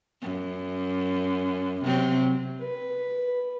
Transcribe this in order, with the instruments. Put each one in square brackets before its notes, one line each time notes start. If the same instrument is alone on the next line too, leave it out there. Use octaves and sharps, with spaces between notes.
[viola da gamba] F#2
C3 F#3 C4
[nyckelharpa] B4